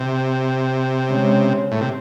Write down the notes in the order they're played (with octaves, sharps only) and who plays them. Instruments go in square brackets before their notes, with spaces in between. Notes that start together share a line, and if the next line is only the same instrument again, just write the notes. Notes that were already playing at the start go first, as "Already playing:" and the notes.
Already playing: [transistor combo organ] C3
[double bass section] C#3 G#3 C#4
[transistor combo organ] A2
C3